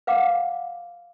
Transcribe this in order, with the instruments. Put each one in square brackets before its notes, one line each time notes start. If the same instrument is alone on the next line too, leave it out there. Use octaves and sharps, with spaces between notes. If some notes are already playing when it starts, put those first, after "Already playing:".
[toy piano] B4 F5 F#5 D6